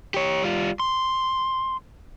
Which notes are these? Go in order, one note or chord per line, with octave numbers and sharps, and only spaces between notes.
G4 C#5
G3 F4
C6